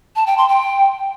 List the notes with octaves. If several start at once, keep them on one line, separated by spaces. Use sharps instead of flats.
A5
G5
C6
G5